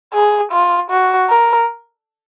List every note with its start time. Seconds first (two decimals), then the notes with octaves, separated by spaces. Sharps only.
0.13 G#4
0.52 F4
0.90 F#4
1.29 A#4